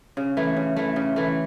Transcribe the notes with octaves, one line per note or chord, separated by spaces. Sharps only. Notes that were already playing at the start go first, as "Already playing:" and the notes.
C#3
E3 A3
C#3
E3 A3
C#3
E3 A3